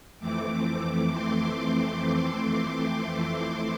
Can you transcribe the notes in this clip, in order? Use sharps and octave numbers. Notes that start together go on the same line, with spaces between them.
F2 E3 A3 C4 D6
C6